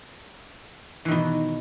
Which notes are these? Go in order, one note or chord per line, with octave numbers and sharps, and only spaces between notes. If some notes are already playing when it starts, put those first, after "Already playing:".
B2 D#3 E3